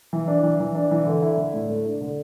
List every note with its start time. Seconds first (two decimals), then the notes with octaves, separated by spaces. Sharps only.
0.13 E3
0.28 D4
0.43 E3
0.60 E3
0.75 D4
0.91 E3
1.07 D3
1.22 E4
1.37 D3
1.54 A2
1.69 A3
1.85 D4
2.01 D3